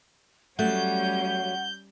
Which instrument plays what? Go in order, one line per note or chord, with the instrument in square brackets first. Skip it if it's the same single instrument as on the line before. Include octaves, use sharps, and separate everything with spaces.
[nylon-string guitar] F#3 A3 [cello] G3 C#4 [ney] F#5 [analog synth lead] G6